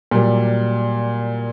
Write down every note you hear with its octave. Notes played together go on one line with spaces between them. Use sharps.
A#2 F#3 G3